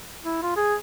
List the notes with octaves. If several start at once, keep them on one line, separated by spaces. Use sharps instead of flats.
E4
F4
G#4